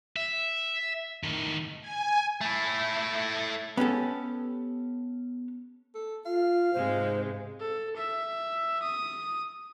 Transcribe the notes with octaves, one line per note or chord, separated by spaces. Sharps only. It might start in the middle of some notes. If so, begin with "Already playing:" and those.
E5
A2 D#3
G#5
A3 E4
B3 C#4 G4 A4
A4
F4 F5
G#2 C3 G#3 C5
A4
E5
D#6